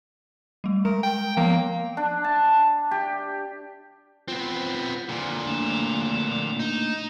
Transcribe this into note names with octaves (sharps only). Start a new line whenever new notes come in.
G3 A3
G#3 A#4
G5
F3 A#3 B3
D4
A5
G4
B3 C4 F4
A#2 D3
A3 A#3 D4
D#4